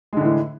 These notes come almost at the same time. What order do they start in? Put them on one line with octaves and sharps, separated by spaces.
G#3 D3 A2 E3